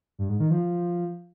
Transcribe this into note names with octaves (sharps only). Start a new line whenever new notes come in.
G2
G#2
D#3
F3